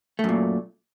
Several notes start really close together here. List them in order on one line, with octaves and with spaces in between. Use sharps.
A3 F#2 A#2